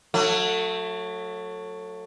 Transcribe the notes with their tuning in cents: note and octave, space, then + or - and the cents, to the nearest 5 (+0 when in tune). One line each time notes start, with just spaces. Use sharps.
F#3 -20 A3 +15